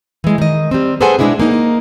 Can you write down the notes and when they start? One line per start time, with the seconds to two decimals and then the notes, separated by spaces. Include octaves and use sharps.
0.24 E3 G#3
0.38 D#3 D#5
0.71 G3 C4
1.01 G#4 A4 B4 C5 F#5 G#5
1.19 B2 F#3 G#3 D4 E4 G#4
1.40 A#3 D#4